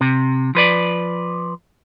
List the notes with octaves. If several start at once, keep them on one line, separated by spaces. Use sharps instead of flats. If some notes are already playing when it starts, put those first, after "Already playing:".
C3
F3 B4 D5